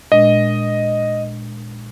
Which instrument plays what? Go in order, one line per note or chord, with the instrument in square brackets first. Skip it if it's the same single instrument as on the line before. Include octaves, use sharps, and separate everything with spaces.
[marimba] A#2 G#3 D4 [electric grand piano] D#5